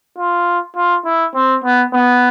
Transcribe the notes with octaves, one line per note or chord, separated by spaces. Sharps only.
F4
F4
E4
C4
B3
B3